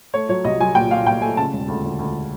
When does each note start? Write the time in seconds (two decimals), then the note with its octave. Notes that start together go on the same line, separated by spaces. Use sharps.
0.14 A3 C#5
0.29 F#3 C#5
0.44 C2 D#5
0.60 F#3 G#5
0.75 A#2 G5
0.91 A#2 F5
1.06 A#2 G5
1.22 A3 G#5
1.37 C#3 A5
1.53 E1
1.68 D2
1.84 D2
1.99 D2